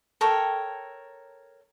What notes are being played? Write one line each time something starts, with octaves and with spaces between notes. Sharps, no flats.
A4 A#4 C#5 G5